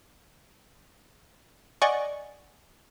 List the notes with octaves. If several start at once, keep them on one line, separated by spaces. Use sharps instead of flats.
D5 D#5 F#5 G#5 C#6